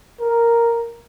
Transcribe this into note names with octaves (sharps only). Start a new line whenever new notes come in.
A#4